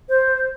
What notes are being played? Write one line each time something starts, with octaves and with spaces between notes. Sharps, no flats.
C5